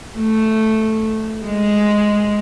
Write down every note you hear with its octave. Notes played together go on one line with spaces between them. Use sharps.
A3
G#3